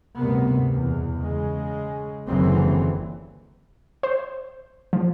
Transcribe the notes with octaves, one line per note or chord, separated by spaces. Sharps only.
D2 G2 C3 A#3 B3
E2 B2
C#3 G#3
F#1 D#2 D3 E3 F#3 C4
C5
F3